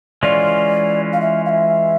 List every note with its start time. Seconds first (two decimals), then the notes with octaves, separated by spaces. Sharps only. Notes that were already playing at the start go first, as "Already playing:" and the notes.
0.23 E3 G#3 C#4 F4 D5
1.13 F5
1.21 E5
1.46 F5
1.49 E5